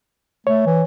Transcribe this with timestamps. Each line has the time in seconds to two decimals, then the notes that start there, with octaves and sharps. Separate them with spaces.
0.47 A3 C#5
0.66 E3